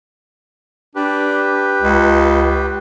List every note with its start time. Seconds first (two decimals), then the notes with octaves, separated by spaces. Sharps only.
0.95 D4 G4 B4
1.82 C#2